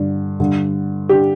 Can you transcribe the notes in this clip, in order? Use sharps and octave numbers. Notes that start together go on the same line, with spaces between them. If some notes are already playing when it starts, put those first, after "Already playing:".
Already playing: G2 D3
G2 D3
D3 G4